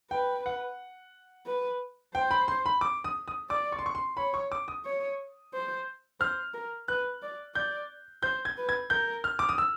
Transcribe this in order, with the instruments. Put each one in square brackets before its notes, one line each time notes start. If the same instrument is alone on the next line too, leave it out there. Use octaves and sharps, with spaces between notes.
[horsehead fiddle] B4 [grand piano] G5
[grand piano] F#5
[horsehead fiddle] B4
[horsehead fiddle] C5 [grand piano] G5
[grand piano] B5
C6
B5
D6
D#6
D#6
[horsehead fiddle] D5 [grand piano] D6
[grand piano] C#6
C6
C#6
C6
[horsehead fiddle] C#5 [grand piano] B5
[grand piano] C#6
D6
D#6
[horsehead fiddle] C#5
C5
[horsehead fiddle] C5 [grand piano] F6
[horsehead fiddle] A#4
[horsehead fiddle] B4 [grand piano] F#6
[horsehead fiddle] D5
[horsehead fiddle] D5 [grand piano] G6
[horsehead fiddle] C5 [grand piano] G6
[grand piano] G#6
[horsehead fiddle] B4
[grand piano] G#6
[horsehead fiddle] A#4 [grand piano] G6
[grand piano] F6
D6
D#6
E6